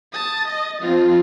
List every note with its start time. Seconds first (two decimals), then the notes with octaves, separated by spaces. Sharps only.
0.13 A5 D#6
0.48 D#5
0.82 F3 C4 F4